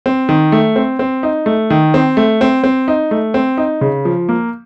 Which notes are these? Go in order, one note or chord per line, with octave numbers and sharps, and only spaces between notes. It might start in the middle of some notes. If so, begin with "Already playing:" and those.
C4
D#3
A3
C4
C4
D#4
A3
D#3
C4
A3
C4
C4
D#4
A3
C4
D#4
C#3
F3
A#3